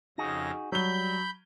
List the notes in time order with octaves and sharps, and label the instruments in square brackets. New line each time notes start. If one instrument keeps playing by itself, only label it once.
[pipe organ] F2 C#3 A#6 [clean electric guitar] D#4 F#4 G#4
[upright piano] F#3 G7 [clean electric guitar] G3 [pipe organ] B5 G6